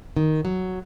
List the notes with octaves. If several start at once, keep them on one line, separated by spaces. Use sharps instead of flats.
D#3
F#3